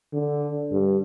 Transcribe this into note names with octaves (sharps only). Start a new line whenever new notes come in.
D3
G2